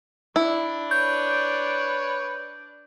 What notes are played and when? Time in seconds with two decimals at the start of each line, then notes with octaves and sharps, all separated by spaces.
0.36 D4 E4 D5
0.91 B4 C#5 G6